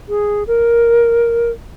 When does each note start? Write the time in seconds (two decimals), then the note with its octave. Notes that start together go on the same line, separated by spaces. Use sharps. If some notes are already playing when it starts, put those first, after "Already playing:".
0.09 G#4
0.47 A#4